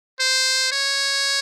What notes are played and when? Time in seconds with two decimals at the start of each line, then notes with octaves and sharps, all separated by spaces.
0.20 C5
0.72 C#5